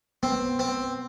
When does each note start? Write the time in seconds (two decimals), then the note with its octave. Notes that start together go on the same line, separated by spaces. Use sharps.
0.23 B3 C4
0.59 C4